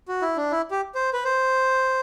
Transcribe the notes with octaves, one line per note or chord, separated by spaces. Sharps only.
F#4
E4
D4
E4
G4
C5
B4
C5